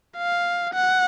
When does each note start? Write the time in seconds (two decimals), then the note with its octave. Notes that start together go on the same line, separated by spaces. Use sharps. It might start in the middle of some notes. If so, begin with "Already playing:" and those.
0.17 F5
0.74 F#5